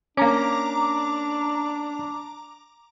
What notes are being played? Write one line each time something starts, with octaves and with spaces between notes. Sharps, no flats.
A#3 C#4 D4 A#5 D6